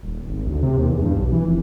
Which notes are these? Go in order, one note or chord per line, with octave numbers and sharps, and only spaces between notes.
D#1
G#1
D2
C3
D#2
E2
G2
B1
E3
F1